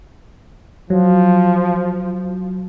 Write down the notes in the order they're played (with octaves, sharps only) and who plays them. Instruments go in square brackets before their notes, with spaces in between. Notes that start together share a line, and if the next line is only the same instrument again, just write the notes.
[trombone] F3 [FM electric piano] F#3